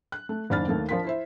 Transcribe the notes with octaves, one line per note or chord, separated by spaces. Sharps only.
F#6
A3
F#1 D#2 D4 B5 F6 A6
D#2 A3 A#3
F3 D4 F4 A#4 B6
E4 C5 E5